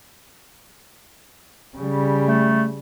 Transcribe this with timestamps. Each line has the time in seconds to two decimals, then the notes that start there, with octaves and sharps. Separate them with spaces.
1.77 C#3 G3
2.26 A3